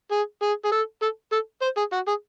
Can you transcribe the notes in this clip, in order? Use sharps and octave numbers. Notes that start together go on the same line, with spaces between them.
G#4
G#4
G#4
A4
A4
A4
C5
G#4
F#4
G#4